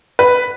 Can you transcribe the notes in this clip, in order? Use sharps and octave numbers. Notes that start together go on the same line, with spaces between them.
B4